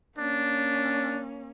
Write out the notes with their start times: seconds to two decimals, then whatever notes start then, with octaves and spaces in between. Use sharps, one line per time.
0.18 A#3 C#4 D4